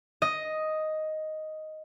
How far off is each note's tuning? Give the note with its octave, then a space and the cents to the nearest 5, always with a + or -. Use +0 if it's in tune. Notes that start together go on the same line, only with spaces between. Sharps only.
D#5 +5